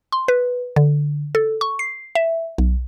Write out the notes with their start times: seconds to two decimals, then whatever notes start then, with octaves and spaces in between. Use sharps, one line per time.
0.12 C6
0.28 B4
0.76 D3
1.35 A4
1.61 C#6
1.79 C7
2.15 E5
2.58 B1